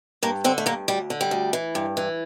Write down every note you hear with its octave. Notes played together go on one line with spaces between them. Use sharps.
G2 A#3
D3 C4
A3
G2 A#3
D2 G3
D3
G3
D2
E3
G2
E3